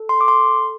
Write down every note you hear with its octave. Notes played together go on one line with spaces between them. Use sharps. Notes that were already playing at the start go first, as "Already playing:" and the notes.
Already playing: A4
C6
D6
C6